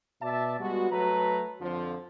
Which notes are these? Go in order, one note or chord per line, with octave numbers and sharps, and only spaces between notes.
B2 D5 E5 A5
G3 G#3 B3 F#4
F#3 A3 B4 A#5
F2 D3 F3